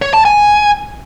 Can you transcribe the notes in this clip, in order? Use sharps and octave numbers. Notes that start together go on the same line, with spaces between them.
C#5
A5
G#5